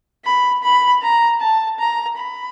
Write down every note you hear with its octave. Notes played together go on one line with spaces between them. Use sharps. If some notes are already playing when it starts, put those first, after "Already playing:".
B5
B5
A#5
A5
A#5
B5